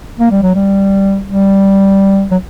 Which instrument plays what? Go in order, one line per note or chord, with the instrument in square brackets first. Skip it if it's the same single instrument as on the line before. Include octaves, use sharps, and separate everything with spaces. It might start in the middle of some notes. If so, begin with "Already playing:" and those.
[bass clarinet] A#3
G3
F#3
G3
G3
F#3